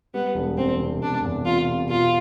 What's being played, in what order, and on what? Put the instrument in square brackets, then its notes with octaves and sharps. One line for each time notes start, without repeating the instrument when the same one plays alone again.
[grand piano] G3 [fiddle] B3
[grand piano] E1
[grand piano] E2 [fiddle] C4
[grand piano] C3
[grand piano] E1 [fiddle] D4
[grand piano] E2
[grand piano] C3 [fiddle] F4
[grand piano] C3
[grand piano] B2 [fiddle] F4